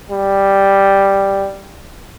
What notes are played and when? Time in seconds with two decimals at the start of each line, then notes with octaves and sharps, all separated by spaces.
0.11 G3